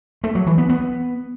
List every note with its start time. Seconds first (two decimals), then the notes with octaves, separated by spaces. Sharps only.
0.24 A3
0.35 F#3
0.47 E3
0.58 B3
0.69 B3